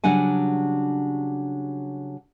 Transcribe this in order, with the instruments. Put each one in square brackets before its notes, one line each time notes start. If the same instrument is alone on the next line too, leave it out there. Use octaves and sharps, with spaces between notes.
[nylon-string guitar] C#3 F#3 G3 D4 F#5 G#5